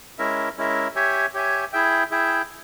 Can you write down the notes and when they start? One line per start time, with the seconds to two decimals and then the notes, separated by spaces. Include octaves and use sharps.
0.18 G#3 C#4 E4 A#4 E5
0.57 G#3 C#4 E4 A#4 E5
0.95 G4 C#5 E5 G#5
1.34 G4 C#5 E5 G#5
1.73 E4 G#4 E5 G5
2.11 E4 G#4 E5 G5